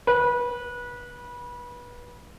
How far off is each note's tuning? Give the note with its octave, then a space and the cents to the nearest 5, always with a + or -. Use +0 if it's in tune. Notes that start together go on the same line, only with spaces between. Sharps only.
B4 -25